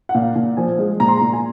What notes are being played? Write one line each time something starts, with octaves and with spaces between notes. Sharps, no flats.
F#5
A#2 F5
A#2
F3 G#5
G#3
A#2 A#5
C6
A#5
A#2
G#5